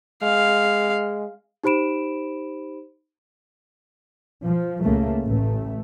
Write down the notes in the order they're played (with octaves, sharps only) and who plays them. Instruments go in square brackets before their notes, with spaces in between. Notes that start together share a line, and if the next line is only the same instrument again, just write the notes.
[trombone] G#3 [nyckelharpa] F5
[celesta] D#4 G4 C5 B5 D7 E7
[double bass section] F3
C#2 C#3 A3 A#3
A1 A3